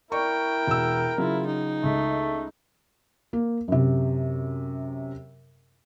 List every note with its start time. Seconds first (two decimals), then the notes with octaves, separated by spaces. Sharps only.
0.12 E4 A#4 D5 G5 C#6
0.67 E1 E6
1.18 C#3 F#3 E4 F4
1.47 D#4
1.84 C#2 A3
3.33 A#3
3.68 F#2 C3